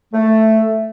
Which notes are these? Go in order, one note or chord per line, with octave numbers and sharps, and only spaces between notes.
A3